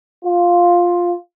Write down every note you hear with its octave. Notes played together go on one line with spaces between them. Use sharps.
F4